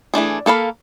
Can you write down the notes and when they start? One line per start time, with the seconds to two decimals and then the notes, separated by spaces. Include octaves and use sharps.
0.14 E3 A3 D4 G#4
0.46 A#3 A4 F5 B5